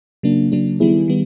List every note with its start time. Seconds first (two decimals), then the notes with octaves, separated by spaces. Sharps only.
0.23 C#3 F#3 A#3 D4
0.52 C#3 F#3 A#3 D4
0.80 D#3 G3 B3 E4 G#4
1.08 D#3 G3 B3